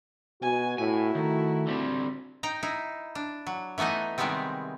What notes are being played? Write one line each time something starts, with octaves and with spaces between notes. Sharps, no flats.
B2 F#4 G#5
A2 E4 G#5
D#3 A3
D3 G3 C4
D#4 G5 A#5
D#4 E4
D4
F#3
E3 A3 B3 D#4 D#5
C3 D#3 G3 G#3 B3 C4